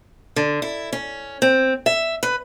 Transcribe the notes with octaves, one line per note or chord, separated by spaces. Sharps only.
D3
E4
C#4
C4
E5
B4